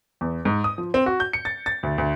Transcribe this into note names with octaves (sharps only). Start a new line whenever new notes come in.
E2
G#2
D#6
F3
C4
F#4
G6
C#7
A6
A6
D2
D2